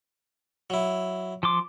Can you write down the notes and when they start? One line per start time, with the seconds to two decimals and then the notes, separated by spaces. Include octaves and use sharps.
0.70 F#3 E4
1.43 F3 C6 D6